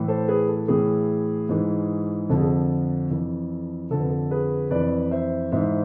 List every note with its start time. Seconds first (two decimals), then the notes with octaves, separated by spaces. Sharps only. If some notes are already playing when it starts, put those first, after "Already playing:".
Already playing: A2 E3
0.08 A4 C5
0.28 G#4 B4
0.48 A4
0.68 A2 E3 G#4
1.49 G#2 E3
2.29 F2 D3 F3 A4
2.38 G#4
2.45 A4
3.10 F2 E3
3.91 F2 D3 F3 A4
4.00 B4
4.10 A4
4.31 G#4 B4
4.71 F2 E3 B4 D5
5.11 C5 E5
5.52 G#2 E3 C5 E5